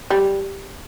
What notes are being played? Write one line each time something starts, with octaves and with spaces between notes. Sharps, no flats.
G3